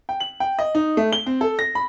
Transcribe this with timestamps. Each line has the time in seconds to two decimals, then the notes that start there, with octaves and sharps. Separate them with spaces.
0.09 G5
0.20 F#7
0.40 G5
0.59 D#5
0.75 D#4
0.97 A3
1.13 G7
1.26 C4
1.41 A4
1.59 A#6
1.75 B5